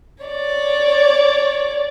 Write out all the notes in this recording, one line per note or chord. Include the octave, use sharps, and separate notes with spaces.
C#5 D5